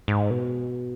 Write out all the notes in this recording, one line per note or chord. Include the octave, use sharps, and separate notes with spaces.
G#2
B2